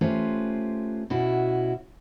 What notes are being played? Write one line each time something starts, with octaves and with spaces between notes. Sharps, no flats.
A3 C#4 F4 G4 B4 C5
B2 C#4 E4 F#4